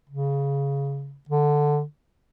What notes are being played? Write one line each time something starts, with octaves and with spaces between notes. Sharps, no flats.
C#3
D3